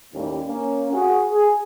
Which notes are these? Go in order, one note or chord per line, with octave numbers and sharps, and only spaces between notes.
D#2 A2 G3 A3 C#4
A#3 C#4
F#4 G#4
G#4